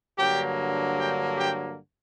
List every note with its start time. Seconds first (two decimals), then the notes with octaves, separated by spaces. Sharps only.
0.18 G2 D3 F#3 A#3 G4 G5
0.98 G4 G5
1.37 G4 G5